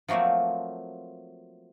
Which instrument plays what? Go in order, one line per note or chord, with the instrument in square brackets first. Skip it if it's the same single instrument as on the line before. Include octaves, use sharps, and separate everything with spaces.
[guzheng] F3 F#3 A3 A#3 C4